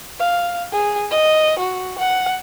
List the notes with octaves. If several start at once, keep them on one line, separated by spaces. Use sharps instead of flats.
F5
G#4
D#5
F#4
F#5